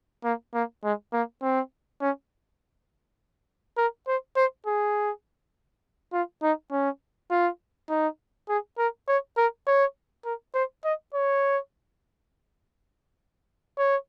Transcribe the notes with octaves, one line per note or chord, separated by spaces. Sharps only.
A#3
A#3
G#3
A#3
C4
C#4
A#4
C5
C5
G#4
F4
D#4
C#4
F4
D#4
G#4
A#4
C#5
A#4
C#5
A#4
C5
D#5
C#5
C#5